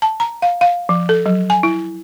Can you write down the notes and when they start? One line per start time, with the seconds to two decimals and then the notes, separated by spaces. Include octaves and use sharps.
0.02 A5
0.20 A#5
0.42 F5
0.61 F5
0.89 F3
1.09 A4
1.26 F#3
1.50 G#5
1.63 E4